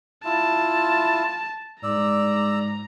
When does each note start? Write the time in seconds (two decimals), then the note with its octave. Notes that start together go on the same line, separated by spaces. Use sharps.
0.25 E4 F4 A5
1.83 G#2 D5 A#5 E6